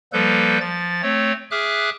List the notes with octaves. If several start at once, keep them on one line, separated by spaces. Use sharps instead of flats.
F3 G3 A#3 A4 B4 G6
F3 A6
A3 C4 C#5
G#4 E5 D6 F6 F#6